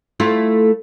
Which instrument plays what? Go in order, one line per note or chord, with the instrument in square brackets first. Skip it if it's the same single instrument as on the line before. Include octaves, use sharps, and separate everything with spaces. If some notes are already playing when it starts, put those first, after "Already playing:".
[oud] A3 E4 F4